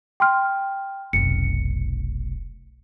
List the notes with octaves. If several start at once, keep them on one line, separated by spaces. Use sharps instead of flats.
G5 C6 F6
F1 B1 C#7